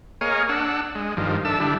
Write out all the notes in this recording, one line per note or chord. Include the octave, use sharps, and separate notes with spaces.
A#3 G#4 C#5 D#5 F5
D4 F#5 E6
G#3
G2 D#3 F3
D4 A4 E5 E6
D3 G3 D4 E4